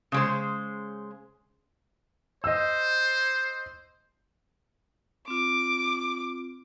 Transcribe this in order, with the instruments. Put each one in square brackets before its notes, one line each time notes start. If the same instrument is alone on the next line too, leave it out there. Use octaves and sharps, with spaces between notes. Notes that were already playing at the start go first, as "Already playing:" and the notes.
[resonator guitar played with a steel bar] C#3 G#3 C5
[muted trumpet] C5 [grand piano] D#5 E6
[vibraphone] C4 F4 [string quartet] D6